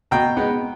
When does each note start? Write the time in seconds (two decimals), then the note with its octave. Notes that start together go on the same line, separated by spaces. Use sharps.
0.11 B2 G5 A#5
0.37 G#3 B3 D#4